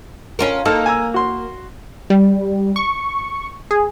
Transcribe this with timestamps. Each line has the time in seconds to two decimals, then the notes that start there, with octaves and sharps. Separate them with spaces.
0.39 C#4 F4 A#4
0.65 A#3 D#4 A4 F6
0.86 G#5 A#5 E6
1.14 F#4 C6
2.10 G3
2.76 C#6
3.71 G#4